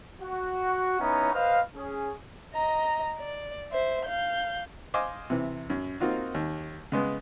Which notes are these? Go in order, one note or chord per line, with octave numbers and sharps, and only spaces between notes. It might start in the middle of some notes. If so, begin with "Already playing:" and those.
F#4
B3 C#4 D#4 E4 C#5 A#5
B4 C5 D#5 F5
C#4 G#4
D#5 A#5
D5
C5 E5
F5 G6
C5 D#5 F5 G#5 D6
C3 E3
F#2
A#3 C4 D#4 F4 F#4
D#2
C#3 G#3 B3